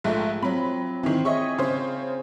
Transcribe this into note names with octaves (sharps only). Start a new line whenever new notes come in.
A#1 G#2 A3 F4
F#3 C4 B5
D#3 E3 C4
G#4 C#5 D#5 E5 C#6
C#3 C5